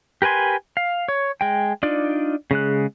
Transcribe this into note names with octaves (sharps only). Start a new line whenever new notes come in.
G4 A#4 B4 G#5 C6
F5
C#5
G#3 G5
D4 D#4 F4 D5
C#3 G#3 F#6